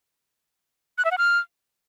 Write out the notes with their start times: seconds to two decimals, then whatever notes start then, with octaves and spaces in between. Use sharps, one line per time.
0.98 F#6
1.05 E5
1.11 F#5
1.18 F6